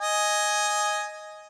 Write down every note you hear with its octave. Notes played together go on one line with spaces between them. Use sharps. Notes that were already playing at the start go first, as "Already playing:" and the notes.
D#5 G#5